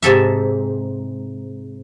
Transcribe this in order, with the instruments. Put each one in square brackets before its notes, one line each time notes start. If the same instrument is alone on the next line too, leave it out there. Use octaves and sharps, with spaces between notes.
[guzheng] G#2 C3 A4 E5